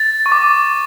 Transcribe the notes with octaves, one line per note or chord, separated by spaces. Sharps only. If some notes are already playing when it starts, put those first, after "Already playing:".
Already playing: A6
C#6
D6